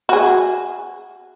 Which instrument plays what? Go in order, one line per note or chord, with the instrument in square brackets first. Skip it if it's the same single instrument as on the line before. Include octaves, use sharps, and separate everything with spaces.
[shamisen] F#4 G#4